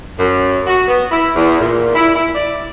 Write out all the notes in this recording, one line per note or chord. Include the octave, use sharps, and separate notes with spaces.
F#2
F#4
B3
E4
E2
A#2
E4
E4
D5